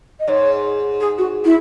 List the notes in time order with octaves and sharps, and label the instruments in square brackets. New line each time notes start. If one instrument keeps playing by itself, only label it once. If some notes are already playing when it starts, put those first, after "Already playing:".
[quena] D#5
[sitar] G#2 [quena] C#5
[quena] G#4
F#4
E4